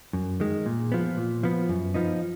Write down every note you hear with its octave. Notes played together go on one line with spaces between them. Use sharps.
F#2
D#3 G#3
A#2
F3 B3
A#2
F3 B3
F#2
F3 B3 D#4